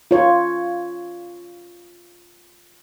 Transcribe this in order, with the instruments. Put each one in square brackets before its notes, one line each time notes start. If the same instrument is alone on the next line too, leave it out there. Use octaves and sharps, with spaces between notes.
[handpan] F4 C#5